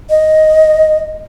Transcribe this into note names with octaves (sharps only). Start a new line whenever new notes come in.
D#5